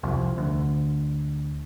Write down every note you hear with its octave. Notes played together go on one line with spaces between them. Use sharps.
C2 F2
D2